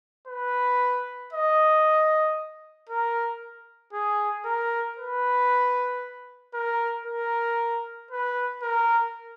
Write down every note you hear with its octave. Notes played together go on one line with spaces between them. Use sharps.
B4
D#5
A#4
G#4
A#4
B4
A#4
A#4
B4
A#4